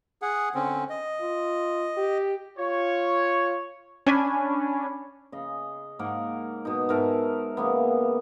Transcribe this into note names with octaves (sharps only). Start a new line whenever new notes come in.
G#4 F#5
D3 C4 C#4
D#5
F4
G4
F4 C#5
C#4 D4 G#5 B5
C#3 D#5
G#2 A#3 A#4 F#5
B2 D#4
G#2 A#4 E5 A5
C#3 A#3 B3